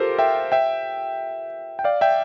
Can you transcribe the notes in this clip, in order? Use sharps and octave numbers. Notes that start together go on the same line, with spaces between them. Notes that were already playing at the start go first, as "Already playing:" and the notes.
Already playing: F4 G4 A4 A#4 C5
E5 G5
E5 G5
G5
D5 F5
E5 G5